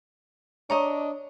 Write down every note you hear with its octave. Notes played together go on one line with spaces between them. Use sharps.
D4 C#5 D#5 A#5 C#6 D6